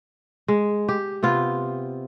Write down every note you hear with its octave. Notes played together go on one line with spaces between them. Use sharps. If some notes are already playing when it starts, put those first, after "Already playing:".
G#3
G4
C3 B3 F4